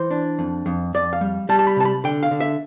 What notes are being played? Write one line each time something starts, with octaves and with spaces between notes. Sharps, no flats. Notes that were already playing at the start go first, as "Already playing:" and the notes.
Already playing: E3 C5
D4
F2
F2
F2 D5
F5
G3
G3 A5
A5
B5
C3 A5
B5
D3 G5
F5
D3
E5